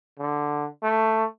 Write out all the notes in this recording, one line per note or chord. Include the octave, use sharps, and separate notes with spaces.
D3
A3